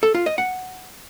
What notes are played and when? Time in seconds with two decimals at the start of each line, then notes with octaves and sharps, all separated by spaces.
0.03 A4
0.14 F4
0.26 D#5
0.38 F#5